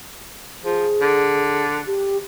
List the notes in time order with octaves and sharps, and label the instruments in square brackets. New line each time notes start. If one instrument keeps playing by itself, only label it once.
[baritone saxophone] F3 [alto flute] G#4
[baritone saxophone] D3
[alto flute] G4